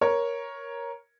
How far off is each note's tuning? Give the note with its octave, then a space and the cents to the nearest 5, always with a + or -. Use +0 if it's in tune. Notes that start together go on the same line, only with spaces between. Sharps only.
A#4 +15 C#5 +0